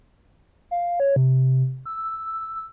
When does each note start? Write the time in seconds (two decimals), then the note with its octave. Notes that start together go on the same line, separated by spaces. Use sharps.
0.71 F5
1.00 C#5
1.16 C3
1.86 E6